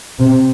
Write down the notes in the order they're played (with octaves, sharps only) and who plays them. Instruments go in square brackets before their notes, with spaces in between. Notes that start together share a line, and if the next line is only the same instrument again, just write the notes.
[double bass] C3